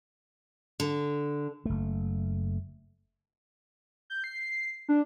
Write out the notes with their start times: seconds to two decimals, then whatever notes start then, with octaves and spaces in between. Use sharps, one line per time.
0.80 D3
1.65 F#1 A3
4.10 G6
4.24 C7
4.89 D4